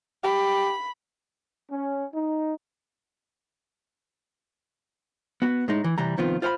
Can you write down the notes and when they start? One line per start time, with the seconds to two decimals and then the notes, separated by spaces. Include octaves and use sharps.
0.24 G4 B5
1.71 C#4
2.13 D#4
5.42 B3 F#4
5.68 A2 G#3 D#4
5.84 E3
5.98 C3 E3 G3 A#5
6.17 C2 D#3 F3 B3 C4 F4
6.42 F4 C5 F5 F#5 B5